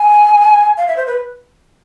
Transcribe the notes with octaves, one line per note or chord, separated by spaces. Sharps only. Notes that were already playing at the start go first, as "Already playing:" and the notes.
Already playing: G#5
F5
E5
C5
B4